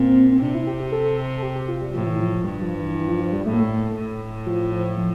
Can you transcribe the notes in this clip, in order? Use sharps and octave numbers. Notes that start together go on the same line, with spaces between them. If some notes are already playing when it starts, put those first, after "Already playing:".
Already playing: A#2 C4
C4
C3 D4
E4
G4
G4
A4
A4
G4
G4
F4
G3
A2 F3
E3
F3
F3
G2 G3
F3
E3
E3
F3
F3
G3
A2 A3
A#3
A3
A2
F3
F3
F3